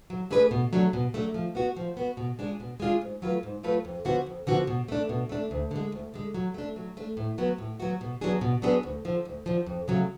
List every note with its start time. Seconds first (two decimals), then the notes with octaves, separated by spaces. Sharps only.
0.10 F#3
0.31 A3 D4 G#4 B4
0.51 B2
0.73 F#3 A3 D4
0.93 B2
1.14 F#3 A3 D4
1.34 F3
1.55 B3 F#4
1.76 F3
1.97 B3 F#4
2.17 B2
2.39 G#3 D4 F4 G#4
2.60 B2
2.80 G#3 D4 F4 G#4
3.01 G#2
3.22 F#3 A3 F4 B4
3.43 G#2
3.63 F#3 A3 F4 B4
3.85 F2
4.05 D3 F3 B3 F#4
4.27 F2
4.47 D3 F3 B3 F#4
4.67 B2
4.88 A3 D4
5.09 B2
5.29 A3 D4
5.51 D2
5.71 D3 G#3
5.92 D2
6.14 D3 G#3
6.34 F#3
6.54 A3 D4
6.76 F#3
6.97 A3 D4
7.17 A2
7.38 F#3 B3 F#4
7.58 A2
7.80 F#3 B3 F#4
8.01 B2
8.21 F#3 B3 D4 G#4
8.41 B2
8.62 F#3 B3 D4 G#4
8.83 D2
9.05 D3 F3
9.25 D2
9.46 D3 F3
9.66 F2
9.88 C#3 F#3 A3